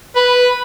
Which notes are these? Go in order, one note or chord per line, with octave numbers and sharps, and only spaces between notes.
B4